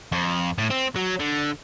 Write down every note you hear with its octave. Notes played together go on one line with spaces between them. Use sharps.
F2
A2
C4
F#3
D3